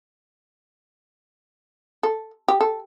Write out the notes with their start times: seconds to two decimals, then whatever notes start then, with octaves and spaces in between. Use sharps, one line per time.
2.03 A4
2.48 G4
2.61 A4